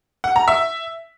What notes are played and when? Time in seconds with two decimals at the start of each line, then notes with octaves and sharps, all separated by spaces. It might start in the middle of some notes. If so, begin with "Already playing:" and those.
0.24 F#5
0.36 A#5
0.48 E5